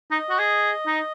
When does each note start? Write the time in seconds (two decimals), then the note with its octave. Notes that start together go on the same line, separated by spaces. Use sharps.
0.11 D#4 D#5
0.30 F#4
0.39 G#4
0.87 D#4